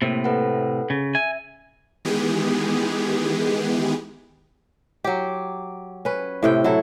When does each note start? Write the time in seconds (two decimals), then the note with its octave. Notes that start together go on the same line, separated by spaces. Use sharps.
0.02 A2 C3 A#3
0.24 A4 B4 F#5
0.90 C#3
1.15 E5 G#5
2.05 D#3 E3 G#3 B3 G4 G#4
5.04 F#3 G4
6.05 C#4 B4
6.43 A2 C3 G5
6.64 F#3 E4 A4